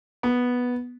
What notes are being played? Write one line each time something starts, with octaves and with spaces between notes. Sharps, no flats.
B3